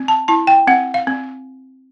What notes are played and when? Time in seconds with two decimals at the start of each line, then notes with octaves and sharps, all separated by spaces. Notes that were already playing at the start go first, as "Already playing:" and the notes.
Already playing: C4
0.08 A5
0.28 E4 A5
0.47 G5
0.67 C4 F#5
0.94 F5
1.07 C4